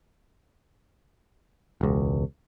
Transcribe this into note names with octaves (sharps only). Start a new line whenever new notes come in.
E1 C#2